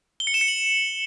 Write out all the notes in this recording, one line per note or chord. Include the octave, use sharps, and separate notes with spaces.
G7
C#7
E7
C#7
F#7